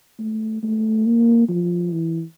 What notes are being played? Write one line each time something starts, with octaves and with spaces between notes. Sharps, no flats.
A3
A3
A#3
F3
E3